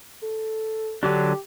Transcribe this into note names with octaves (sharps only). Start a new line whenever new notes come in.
A4
D3 F#3 D4 G4